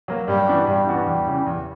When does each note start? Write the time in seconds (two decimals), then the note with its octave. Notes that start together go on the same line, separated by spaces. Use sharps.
0.08 F#3 A#3
0.28 G2 G3
0.47 E3 B3 D4 F#4
0.67 G2 G3
0.87 E3 B3 D4 F#4
1.06 E2 G3
1.27 C#3 E3
1.46 E2